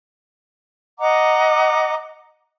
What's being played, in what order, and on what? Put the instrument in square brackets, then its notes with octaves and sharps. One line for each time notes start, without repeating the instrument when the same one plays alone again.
[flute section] D#5 F#5 A#5 D6